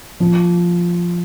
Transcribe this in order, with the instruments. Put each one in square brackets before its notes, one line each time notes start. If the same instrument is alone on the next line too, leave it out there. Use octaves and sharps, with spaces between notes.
[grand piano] F3